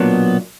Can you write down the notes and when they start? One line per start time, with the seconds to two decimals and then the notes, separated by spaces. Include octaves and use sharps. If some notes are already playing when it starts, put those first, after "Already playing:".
Already playing: B1 A#2 F#3 A#3 B3 D4